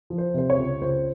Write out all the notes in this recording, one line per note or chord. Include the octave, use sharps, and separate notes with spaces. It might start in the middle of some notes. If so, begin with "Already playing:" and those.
F3
C5
C3 C5
C#5
C#2
C#2 C5